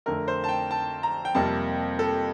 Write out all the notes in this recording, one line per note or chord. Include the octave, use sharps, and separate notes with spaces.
F2 D3 A3 A#4
C5
A5
G5
A5
A#5
G5
F2 C3 G3 A#3 A5
A4